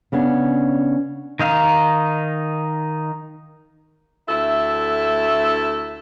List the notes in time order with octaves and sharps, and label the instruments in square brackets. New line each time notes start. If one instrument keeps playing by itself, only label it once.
[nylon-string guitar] C#3 B3 C#4 D4
[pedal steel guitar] D#3 D#4 F5
[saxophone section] D2 E4 A4 E5